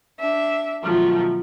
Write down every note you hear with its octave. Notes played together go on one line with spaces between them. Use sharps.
D4 E5
B2 D#3 F3 F#3 A3